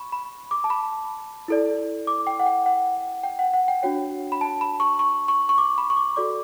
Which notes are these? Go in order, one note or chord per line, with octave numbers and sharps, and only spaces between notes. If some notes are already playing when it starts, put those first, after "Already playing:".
Already playing: B5 C#6
B5
D6
A5
B5
E4 A4 D5
D6
G5
F#5
G5
F#5
G5
F#5
F#5
G5
D4 F#4 C#5 G5
B5
A5
B5
C#6
C#6
C#6
C#6
D6
B5
C#6
D6
F#4 A4 D5 D6